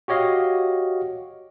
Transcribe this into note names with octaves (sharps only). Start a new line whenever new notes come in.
F#4 G4 C#5 D#5 F5